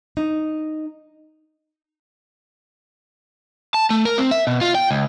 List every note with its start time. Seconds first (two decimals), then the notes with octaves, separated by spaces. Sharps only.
0.17 D#4
3.74 A5
3.90 A3
4.05 A#4
4.18 C4
4.31 E5
4.47 B2
4.61 F4
4.75 G5
4.91 C#2